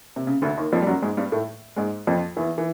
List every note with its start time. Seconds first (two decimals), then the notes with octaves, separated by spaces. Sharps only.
0.16 C3
0.27 C#3
0.42 D2 D3
0.57 D#2 D#3
0.72 F2 F3
0.82 G3
0.87 F#2 F#3
1.02 G#2 G#3
1.17 G2 G3
1.32 A2 A3
1.76 G#2 G#3
2.07 F2 F3
2.37 E2 E3
2.58 E3